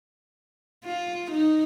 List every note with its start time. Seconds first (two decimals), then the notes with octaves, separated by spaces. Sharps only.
0.85 F4
1.31 D#4